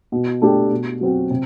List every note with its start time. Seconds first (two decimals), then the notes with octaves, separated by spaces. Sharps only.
0.12 B2
0.42 A3 D4 G4
0.71 B2
1.01 F#3 C4 F#4
1.31 C3